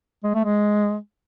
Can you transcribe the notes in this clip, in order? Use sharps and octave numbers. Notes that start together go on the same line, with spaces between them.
G#3
A3
G#3